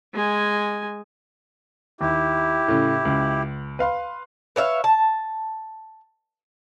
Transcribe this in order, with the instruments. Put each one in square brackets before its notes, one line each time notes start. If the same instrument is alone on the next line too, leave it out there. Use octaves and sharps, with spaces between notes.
[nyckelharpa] G#3 G#5
[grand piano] D#2 [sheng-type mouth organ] E4 G4
[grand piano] A2 C#3
C#2
B4 F5 C6
[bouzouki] B4 C#5 E5 F5
A5